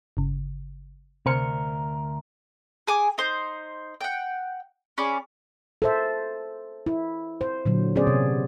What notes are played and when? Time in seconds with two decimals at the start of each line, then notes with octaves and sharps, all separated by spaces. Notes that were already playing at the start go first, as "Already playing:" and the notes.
0.17 G1 C#3
1.26 D2 C3 A#4 C5 C#7
2.87 G#4 G#5 D6
3.18 D#4 C5
4.01 F#5 G5
4.98 C#4 G#4 D5 B5
5.82 A4 C5 E5
6.86 E4
7.41 C5
7.65 A#2 D3 F#3
7.96 B3 C#4 G#4 C5 D5
8.07 C3